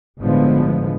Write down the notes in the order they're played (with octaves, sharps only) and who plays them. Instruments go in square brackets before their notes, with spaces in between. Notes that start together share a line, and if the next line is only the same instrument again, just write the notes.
[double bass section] G1 A2 D3 F3 G#3 B3